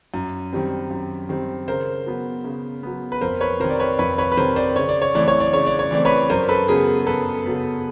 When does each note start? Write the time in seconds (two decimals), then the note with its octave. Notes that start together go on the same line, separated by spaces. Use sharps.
0.14 F#2
0.53 D#3 G3 C4
0.90 F#2
1.29 D#3 G3 C4
1.68 C#3 A#4 C5
2.06 F#3 B3
2.44 C#3
2.83 F#3 B3
3.12 B4
3.21 F2 A#4 C5
3.41 B4 C#5
3.60 C3 D#3 A#4 C5
3.70 D5
3.80 B4 C#5
3.99 F2 B4 C#5
4.18 B4 C#5
4.32 B4
4.37 C3 D#3 A#4 C5
4.56 C5 D5
4.76 C#3 C#5
4.89 D5
5.02 C#5
5.15 E3 A3 C4 D5
5.28 C#5
5.40 D5
5.53 C#3 C#5
5.67 D5
5.79 C#5
5.91 E3 A3 C4 D5
6.05 B4 C#5
6.30 F#2 A#4 C5
6.49 A4 B4
6.68 C#3 F#3 B3 G#4 A#4
7.07 F#2 A4 B4
7.46 C#3 F#3 B3